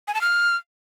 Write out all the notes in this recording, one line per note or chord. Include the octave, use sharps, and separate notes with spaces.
G#5
A5
F6